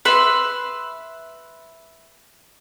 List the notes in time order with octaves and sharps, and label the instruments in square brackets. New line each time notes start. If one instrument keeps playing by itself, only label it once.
[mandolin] B4 E5 C6